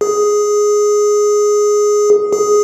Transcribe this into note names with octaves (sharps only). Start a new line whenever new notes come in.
G#4
G#4